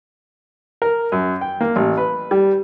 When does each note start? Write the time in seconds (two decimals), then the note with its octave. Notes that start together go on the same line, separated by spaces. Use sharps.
0.82 A#4
1.12 F#2
1.41 G5
1.61 A#3
1.76 A1
1.97 B4
2.31 G3